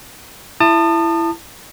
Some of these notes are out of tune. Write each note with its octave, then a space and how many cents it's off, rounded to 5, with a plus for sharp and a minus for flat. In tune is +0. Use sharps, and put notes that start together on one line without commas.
E4 +15 A5 +25 D#6 -35